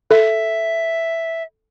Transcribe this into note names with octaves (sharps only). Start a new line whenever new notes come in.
A4 E5